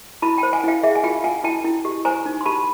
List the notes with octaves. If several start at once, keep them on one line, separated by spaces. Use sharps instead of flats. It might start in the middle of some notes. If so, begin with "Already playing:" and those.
E4 A5 B5
G5 A5
C5
F#5 G#5
E4 F5 G5
G#4 E5 F#5
G#5
F4 F5 G5
F4 F#5 G#5
E4 G5 A5
E4
G4
C5 G#5 A#5
D#4
C6
G4 A5 B5